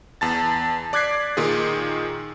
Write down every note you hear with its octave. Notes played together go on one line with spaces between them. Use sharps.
E2 A5 A6
D5 D6 F#6 G#6 B6 C7
A#2 D#3 F4 G#4